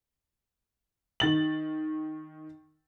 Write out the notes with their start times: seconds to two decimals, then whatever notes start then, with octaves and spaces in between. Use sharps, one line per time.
1.20 D#3 A6 F#7